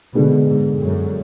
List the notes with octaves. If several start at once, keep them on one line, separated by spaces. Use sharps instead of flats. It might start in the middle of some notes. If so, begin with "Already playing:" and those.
B2 D3 G#3 B3 D4
G#2
F#2